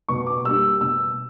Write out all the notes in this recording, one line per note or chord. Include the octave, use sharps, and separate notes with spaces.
B2 C#6
D6
G3 A#3 D4 E6
B2 E6